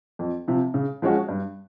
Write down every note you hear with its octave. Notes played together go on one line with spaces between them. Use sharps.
F2
C3 F3
C#3
F3 G#3 C#4 F#4
G2